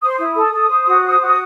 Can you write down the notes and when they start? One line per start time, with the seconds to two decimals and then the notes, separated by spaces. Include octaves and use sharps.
0.02 C5 D#6
0.09 C6
0.16 E4 D#6
0.36 A4
0.52 A4
0.70 C5
0.86 F#4
1.03 C5
1.20 F#4